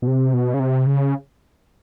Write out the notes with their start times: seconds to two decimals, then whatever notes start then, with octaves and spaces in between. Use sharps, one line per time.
0.02 B2
0.07 C3
0.34 B2
0.54 C#3
0.60 C3
0.86 C#3